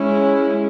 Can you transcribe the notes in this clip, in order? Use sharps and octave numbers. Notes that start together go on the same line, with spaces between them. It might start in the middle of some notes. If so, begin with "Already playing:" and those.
Already playing: G#3 C#4 E4